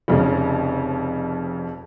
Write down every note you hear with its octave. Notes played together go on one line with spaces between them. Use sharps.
F1 F2 C#3